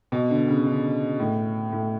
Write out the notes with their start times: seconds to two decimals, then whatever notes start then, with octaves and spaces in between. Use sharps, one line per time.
0.12 B2
0.30 D3
0.48 C#3
0.66 D3
1.20 A2
1.73 A2